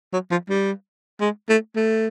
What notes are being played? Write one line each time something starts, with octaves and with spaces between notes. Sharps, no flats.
F#3
F3
G3
G#3
A3
A3